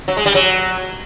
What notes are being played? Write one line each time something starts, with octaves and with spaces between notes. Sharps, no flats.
F#3
G#3
G3
F#3